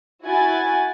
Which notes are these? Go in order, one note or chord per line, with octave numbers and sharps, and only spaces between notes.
E4 F#4 G#5 A6